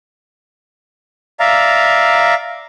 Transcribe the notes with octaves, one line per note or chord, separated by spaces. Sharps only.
D5 E5 F5 A#5